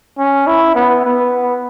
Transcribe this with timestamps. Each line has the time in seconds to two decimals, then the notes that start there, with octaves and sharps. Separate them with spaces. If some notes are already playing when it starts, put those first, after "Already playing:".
0.19 C#4
0.47 E4
0.75 B3
1.05 B3